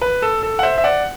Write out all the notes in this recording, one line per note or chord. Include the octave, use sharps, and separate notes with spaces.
B4
A4
A4
F#5
C5 E5
E5
D5 F#5